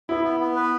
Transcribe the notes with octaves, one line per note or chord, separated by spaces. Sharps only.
B3 E4
B3
B3
B4